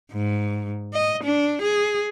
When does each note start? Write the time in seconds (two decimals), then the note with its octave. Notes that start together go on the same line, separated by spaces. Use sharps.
0.12 G#2
0.94 D#5
1.24 D4
1.62 G#4